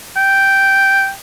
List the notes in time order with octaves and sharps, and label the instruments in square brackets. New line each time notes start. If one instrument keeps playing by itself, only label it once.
[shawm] G5